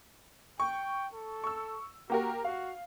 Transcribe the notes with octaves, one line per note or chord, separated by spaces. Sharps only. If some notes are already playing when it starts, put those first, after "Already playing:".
G5 C#6
A4
C#6 E6
A#3 F#4 G4 A#4
F#4 F5